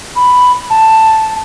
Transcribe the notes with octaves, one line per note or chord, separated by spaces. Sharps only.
B5
A5